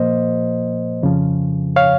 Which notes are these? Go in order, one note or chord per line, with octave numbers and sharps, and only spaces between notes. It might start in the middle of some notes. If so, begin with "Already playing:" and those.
Already playing: A#2 F3 A#3 C5 D#5
F2 C#3 F3
C#5 F5